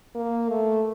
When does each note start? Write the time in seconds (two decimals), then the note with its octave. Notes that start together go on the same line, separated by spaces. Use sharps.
0.15 A#3
0.50 A3